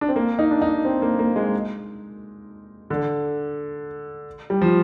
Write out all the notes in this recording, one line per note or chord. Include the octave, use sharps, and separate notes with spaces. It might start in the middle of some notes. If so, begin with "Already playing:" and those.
D4
C4
A#3
D#4
D4
D#4
C4
A#3
A#3
G#3
D3
G3
F3